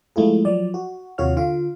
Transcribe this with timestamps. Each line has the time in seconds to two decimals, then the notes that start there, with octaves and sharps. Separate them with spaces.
0.16 F3 G#3 A3 E4 F4 G#4
0.45 F3 F#3 D5
0.74 F#4
1.18 D#2 C3 F4 F#4 C#5 F6
1.37 D3 F4 F5